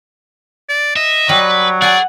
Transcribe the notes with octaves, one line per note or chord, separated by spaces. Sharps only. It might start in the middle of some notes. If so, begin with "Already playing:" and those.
D5
D#5 E5
F#3 G3 B4
G#4 D5 F#5 G#5